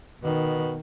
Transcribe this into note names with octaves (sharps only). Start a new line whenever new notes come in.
B2 D#3